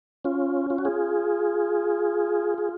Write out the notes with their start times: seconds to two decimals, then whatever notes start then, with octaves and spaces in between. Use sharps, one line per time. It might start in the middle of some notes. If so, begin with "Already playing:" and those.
0.24 C#4 F4
0.70 F4
0.78 F#4
0.85 F4 G#4
2.58 G#4